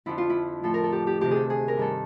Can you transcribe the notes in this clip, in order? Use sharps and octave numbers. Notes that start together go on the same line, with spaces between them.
F2 D3 F3 E4
F4
E4
A2 F3 A4
A#4
A4
G4
G4
D2 C3 D#3 G4
G#4 A4
G#4
A#4
G2 D#3 A4